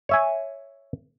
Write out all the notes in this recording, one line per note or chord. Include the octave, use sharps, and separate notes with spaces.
C#5 E5 G#5